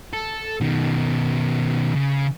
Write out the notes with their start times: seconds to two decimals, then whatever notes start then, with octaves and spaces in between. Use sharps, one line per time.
0.13 A4
0.61 B2 D#3
1.95 C#3